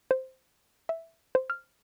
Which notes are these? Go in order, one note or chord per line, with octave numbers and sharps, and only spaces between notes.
C5
E5
C5
F6